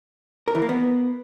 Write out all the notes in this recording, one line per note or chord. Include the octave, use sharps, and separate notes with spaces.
A#4
E3
A#3
B3